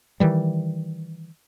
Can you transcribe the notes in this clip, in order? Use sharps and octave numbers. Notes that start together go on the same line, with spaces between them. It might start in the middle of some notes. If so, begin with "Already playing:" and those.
D#3 E3 G3